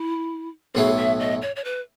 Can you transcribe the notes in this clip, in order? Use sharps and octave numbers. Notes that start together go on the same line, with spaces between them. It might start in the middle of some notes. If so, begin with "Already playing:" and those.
Already playing: E4
B1 A2 F#3 B3 E4 G#4
E5
D#5
C#5
C#5
B4